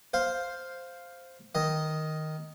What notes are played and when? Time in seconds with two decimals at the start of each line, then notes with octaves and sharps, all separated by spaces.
0.14 C5 F5
1.55 D#3 D#5